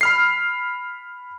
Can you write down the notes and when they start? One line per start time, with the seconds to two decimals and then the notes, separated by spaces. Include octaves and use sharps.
0.01 B5 F6 C7